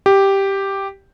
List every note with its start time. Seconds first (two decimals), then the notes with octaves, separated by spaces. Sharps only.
0.06 G4